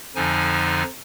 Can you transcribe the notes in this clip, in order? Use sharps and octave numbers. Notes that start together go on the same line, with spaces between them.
F2 D3 F3 D#4 G#5